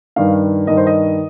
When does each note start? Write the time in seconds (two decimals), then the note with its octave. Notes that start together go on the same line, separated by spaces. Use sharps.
0.16 G2 D#3 F5
0.67 G2 D#3 D#5
0.77 C5
0.87 D#5